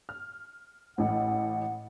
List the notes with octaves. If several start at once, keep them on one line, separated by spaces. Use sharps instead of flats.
F6
A1 A2 F#5